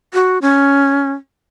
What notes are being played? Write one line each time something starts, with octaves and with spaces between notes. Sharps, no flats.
F#4
C#4